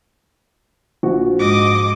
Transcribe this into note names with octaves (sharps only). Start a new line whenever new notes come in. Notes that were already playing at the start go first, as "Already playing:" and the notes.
A#1 F#4
G#2 D#5 D6